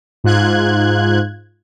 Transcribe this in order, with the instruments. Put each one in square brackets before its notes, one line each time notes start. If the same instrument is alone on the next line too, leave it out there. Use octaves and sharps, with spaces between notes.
[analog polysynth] G#2 F4 F#6 G#6